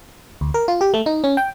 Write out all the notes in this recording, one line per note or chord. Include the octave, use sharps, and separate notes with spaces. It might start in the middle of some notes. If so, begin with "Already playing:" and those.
D2
A#4
F4
G4
A3
D#4
C#4
G5